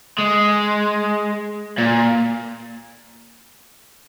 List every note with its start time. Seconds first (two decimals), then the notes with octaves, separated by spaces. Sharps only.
0.18 G#3
1.78 A#2